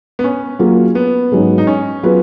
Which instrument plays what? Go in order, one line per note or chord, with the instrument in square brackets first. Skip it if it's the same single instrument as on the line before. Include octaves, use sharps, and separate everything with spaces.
[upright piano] B3
C#4
[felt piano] F#3 A#3 F4 G#4
[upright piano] B3
[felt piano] G#2 F#3 C#4 G#4
[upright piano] D#4
C#4
[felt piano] F#3 B3 F4 G#4 B4